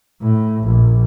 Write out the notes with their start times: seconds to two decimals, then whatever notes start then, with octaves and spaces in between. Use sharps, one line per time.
0.21 A2
0.64 A#1